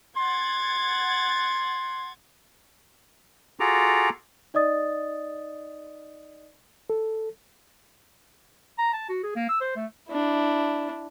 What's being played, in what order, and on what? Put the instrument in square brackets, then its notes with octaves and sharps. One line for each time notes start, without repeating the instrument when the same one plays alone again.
[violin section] F#5 G#6 A6 [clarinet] C6
[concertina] F4 F#4 G#4 A4 A#5 D6
[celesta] D#4 D5 D#5 D#6 A6
[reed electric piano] A4
[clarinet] A#5
A5
F#4
G#4
A#3
E6
C5
A3
[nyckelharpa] D4 E4